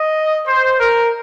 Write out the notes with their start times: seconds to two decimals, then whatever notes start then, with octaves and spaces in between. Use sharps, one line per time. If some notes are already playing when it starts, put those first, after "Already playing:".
Already playing: D#5
0.45 C5
0.79 A#4